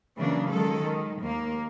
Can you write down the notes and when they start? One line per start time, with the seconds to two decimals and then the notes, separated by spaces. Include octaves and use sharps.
0.18 C#3 E3 F#3 A#3 D4
0.49 D#3 F#3 G#3 A4
0.81 D#3
1.23 D#2 A#3